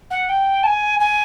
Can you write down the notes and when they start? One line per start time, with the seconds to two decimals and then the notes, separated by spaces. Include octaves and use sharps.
0.11 F#5
0.29 G5
0.63 A5
0.67 G#5
1.00 G#5